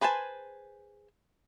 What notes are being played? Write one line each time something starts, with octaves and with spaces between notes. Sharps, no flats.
G#4 B4 C5 G#5 A5